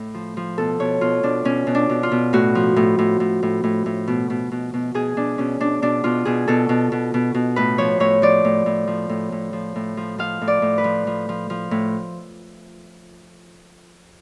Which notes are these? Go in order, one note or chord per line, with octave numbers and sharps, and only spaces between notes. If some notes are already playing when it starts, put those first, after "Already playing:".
Already playing: A2
F3
F3
B2 A4
B2 C#5
B2 F4
B2 D4
B2 C#4
B2
D4
B2
F4
B2
A2 F#4
F3
A2
A2
A2
A2
A2
A2
B2
B2
B2
B2
B2 G#4
B2 D4
B2 C#4
B2 D4
B2 D4
B2 F4
B2 G#4
B2 A4
B2
B2
B2
B2
A2 B4
F3 C#5
A2 C#5
F3 D5
A2
A2
F3
A2
A2
F3
A2
F3
F3 F5
A2
D5
A2
B4
F3
F3
F3
F3
A2